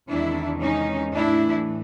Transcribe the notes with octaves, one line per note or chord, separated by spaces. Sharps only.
E2 C3 D#3 G#3 D4 E4
C#4 D#4
A2 E3 A3 D4 E4